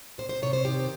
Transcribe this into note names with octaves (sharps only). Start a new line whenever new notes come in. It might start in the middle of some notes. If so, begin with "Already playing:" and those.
C3 C5
C5
C3 C#5
C5
D#3 G4